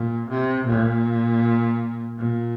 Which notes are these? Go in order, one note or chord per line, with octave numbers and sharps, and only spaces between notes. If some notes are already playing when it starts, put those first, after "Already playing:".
Already playing: A#2
C3
A#2
A#2